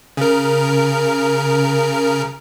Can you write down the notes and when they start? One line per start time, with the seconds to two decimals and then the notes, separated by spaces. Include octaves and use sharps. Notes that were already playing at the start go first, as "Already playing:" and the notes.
0.17 C#3 A#4